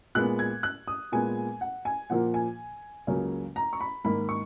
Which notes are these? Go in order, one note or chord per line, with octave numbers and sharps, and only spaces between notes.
A#2 G#3 B3 F#6
G#6
F#6
D#6
A#2 G#3 B3 G#5
F#5
G#5
A#2 F3 A#3 F#5
G#5
C#2 C#3 F#3 A#3 C#4
A#5
C#6
B5
G#2 D#3 A#3 B5
C#6